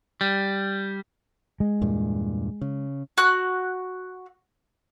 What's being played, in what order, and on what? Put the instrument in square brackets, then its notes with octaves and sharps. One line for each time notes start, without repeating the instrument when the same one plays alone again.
[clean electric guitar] G3
[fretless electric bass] G#3
[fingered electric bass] E2 G2 A#2
C#3
[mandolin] F#4 F#6